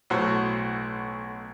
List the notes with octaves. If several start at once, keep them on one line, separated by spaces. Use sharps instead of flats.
B1 A2 F#4 C5 C#5